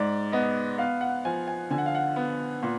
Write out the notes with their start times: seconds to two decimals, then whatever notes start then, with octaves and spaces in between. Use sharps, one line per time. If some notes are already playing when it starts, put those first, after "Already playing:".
Already playing: G#2 D5
0.32 B3 D#5
0.78 B3 F5
1.01 F#5
1.25 F3 G#5
1.48 G#5
1.70 D3 G#5
1.78 F#5
1.86 F5
1.95 F#5
2.16 B3
2.63 A#2